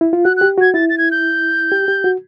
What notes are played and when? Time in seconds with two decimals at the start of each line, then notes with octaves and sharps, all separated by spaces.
0.01 E4
0.13 F4
0.25 F#4 F#6
0.37 G4 F#6
0.58 F#4 G#6
0.74 E4 A6
0.90 A6
0.98 G#6
1.11 G6
1.72 G4
1.88 G4
2.04 F#4